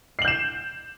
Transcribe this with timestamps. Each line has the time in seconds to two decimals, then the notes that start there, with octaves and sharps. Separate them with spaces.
0.19 C7
0.22 F#7
0.25 G6
0.28 E7